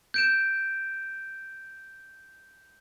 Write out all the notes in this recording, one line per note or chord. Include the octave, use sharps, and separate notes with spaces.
G6 D7 E7